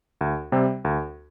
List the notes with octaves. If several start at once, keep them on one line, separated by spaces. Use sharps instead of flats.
D2
C3 G3 C4
D2